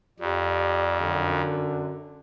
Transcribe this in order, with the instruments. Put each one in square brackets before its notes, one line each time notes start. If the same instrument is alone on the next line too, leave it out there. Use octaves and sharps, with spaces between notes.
[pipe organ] F2 [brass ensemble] G4 D5
[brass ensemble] F#2 D3